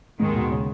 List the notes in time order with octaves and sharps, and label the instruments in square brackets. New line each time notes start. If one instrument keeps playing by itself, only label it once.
[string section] D#2 D#3 G#3 [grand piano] G#2
[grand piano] B2
C#3